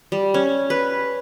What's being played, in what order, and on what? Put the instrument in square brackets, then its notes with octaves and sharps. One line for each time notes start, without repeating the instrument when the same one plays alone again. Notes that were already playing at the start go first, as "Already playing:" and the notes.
[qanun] G3
C#4
B4